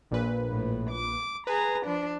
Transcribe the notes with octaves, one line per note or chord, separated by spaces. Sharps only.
A#1 A#2 B4
A2
D6
G#4 B4 A#5
F3 D4